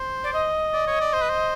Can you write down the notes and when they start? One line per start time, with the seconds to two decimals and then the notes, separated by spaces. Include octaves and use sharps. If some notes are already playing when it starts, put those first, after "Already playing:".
Already playing: C5
0.24 D5
0.33 D#5
0.73 D5
0.87 C#5
1.01 D5
1.13 C5
1.22 B4
1.30 C5